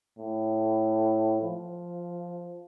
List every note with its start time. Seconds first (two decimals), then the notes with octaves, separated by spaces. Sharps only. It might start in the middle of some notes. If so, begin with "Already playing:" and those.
0.18 A2
1.42 F3